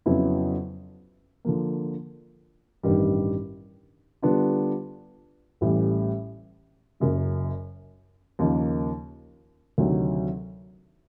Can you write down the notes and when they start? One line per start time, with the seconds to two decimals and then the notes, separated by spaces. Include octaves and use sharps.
0.06 F2 C#3 F#3 B3 E4
1.45 D3 F3 A#3
2.83 A1 G2 D#3 G3
4.22 D3 G3 B3 D4 F4
5.61 A1 A2 E3 G3
7.00 F#1 F#2 C#3
8.39 D#2 C#3 F3 A#3 D#4
9.78 D2 C3 D#3 F#3